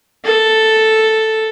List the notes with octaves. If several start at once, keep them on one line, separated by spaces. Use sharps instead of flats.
A4